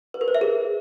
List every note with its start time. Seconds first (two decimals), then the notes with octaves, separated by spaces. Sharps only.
0.14 B4
0.21 A#4
0.28 C5
0.35 E5
0.41 G#4